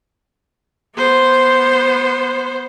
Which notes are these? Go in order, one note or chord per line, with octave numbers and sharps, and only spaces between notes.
B3 C5